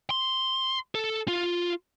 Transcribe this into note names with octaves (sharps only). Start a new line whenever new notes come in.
C6
A4
F4